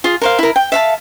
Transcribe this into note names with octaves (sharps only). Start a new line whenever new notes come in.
F4 G#4
A#4 C5 F5
E4 A#4
G5
E5 F5 A5